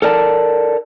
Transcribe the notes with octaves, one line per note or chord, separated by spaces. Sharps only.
A4 A#4 D5 A5